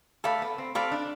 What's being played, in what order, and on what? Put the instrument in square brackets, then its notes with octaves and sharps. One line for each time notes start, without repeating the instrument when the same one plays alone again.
[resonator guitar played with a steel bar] A3 [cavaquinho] A4 D5 F5 B5
[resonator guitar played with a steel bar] B3
C4
[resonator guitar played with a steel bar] C4 [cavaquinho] A4 D5 F5 B5
[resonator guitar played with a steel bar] D4